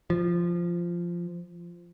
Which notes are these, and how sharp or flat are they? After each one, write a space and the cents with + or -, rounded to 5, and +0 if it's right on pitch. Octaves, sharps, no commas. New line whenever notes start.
F3 -10